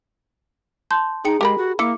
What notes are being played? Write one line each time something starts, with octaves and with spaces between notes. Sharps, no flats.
A5 C6 G6
D#4 G#4 G5 C#7
G#3 G4 A#4 B5
F#4
A#3 E4 D6 C#7